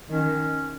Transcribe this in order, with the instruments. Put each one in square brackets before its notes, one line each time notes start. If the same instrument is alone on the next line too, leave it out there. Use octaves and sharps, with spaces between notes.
[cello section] D#3 [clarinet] C#4